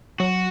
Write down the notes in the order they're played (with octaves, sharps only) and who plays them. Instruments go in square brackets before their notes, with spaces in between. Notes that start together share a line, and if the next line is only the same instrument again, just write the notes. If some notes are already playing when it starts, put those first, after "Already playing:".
[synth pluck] F#3 [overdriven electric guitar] F#4